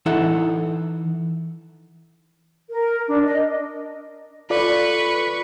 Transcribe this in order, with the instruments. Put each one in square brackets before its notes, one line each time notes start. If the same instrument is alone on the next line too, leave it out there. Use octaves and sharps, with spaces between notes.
[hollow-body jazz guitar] E3 D#4 E4 A4 E5 F#5
[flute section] A#4
D4
D#5
[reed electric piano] F4 A4 D5 [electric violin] B4 C#6